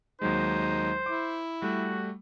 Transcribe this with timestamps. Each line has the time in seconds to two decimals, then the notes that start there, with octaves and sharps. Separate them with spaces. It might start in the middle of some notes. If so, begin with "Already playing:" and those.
0.22 D#2 F#3 G#3 D#4 C5
1.06 E4 D6
1.62 G3 A3 F#4